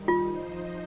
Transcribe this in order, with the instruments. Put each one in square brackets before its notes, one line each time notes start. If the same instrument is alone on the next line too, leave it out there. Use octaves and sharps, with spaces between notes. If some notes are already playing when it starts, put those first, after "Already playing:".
Already playing: [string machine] D#3 G3 D#4
[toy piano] F4
[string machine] F3 D#4 C5 D#5